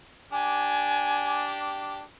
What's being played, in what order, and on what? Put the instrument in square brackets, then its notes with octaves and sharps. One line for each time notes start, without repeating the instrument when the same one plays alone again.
[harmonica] D4 G4 [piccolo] G#5